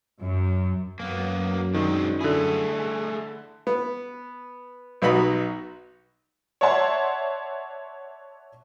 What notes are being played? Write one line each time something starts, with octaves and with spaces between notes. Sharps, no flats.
F#2
F#2 A#3 B3
D#3 G#3 C4 D4
D3 A3 E4 G#4
B3
B1 F#3 B3 D#4 F#4 B5
C#5 D5 E5 F#5 A5 C6